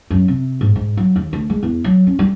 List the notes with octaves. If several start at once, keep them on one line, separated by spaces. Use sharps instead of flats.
F#2
C3
G#2
G#2
F#3
D#2
D2
G#3
E2
F#3
C#4
G3